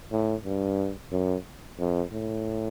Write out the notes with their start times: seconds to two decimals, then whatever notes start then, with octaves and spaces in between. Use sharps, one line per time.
0.12 A2
0.45 G2
1.12 F#2
1.79 F2
2.12 A2